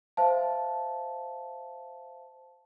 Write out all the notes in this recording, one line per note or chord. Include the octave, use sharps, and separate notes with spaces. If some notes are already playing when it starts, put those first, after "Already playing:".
C5 E5 F5 A5